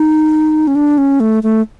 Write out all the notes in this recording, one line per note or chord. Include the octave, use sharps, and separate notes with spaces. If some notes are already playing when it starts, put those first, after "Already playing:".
Already playing: D#4
C#4
D4
C#4
A3
A3